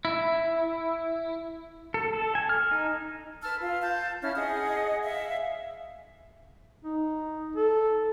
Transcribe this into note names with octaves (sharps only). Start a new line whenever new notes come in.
E4
A4
A4
G#5
F6
D#4
B4 A5 E6 F6
F4 F5
A5 G6
C#4 E4 F6
G#4 D#5 F#5 D#6
E5 F5
D#4
A4